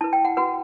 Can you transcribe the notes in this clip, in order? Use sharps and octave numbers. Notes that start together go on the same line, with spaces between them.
E4 B4 A5
G5
F#5
F#4 B4 F#5